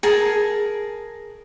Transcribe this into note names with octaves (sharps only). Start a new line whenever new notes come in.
G#4 A#4 A5